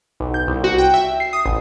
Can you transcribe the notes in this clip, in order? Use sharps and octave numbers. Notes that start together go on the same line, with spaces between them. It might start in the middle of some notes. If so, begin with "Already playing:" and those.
B1
G6
C2
F#4
G5
E5
C7
D#6
A1